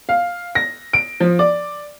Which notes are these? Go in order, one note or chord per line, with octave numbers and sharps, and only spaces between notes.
F5
A#6
D7
F3
D5